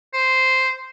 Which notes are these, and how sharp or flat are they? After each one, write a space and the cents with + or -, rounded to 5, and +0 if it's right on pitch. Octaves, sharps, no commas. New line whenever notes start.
C5 -5